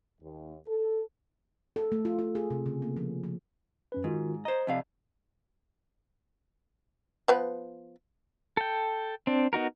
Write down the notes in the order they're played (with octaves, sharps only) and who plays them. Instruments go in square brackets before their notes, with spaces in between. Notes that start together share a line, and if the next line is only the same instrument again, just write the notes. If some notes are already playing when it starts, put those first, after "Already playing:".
[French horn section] D#2
A4
[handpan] A4
A3
F4
F4
G#4
C3
C#3
A#3
F3
F3
[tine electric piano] F#2 C#4 B4
[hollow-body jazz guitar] G#2 [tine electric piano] D#3 F4 F#4
[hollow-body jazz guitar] C5 D#5 [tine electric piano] A#5
[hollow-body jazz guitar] F2 C3 F5 [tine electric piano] D5 D#5
[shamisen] F3 B3 B4
[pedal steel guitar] A4 G5
C4 D4
B3 D#4 F#4 A#4